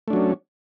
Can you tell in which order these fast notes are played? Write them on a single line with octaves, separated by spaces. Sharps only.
A3 D4 F#3 C#4